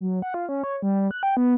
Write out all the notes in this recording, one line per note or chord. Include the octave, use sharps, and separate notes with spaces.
F#3
F#5
F4
C#4
C#5
G3
F#6
G5
B3